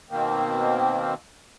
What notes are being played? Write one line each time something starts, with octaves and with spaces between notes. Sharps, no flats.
B2 D#3 A#3 C4